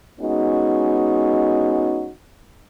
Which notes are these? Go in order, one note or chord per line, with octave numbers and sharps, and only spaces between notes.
G#3 B3 C#4 D#4 F#4